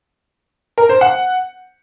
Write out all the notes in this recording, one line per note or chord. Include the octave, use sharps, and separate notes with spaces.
A#4
C5
F#5